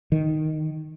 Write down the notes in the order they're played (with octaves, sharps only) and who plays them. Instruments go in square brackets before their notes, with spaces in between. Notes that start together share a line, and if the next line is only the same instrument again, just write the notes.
[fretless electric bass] D#3